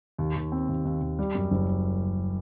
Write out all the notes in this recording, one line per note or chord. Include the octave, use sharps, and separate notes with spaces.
D#2
D#2
C4
D#2
D#2
D#2
G3
F#2
F#1